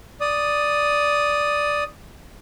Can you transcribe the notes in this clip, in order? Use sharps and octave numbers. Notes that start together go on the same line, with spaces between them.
D5 D#6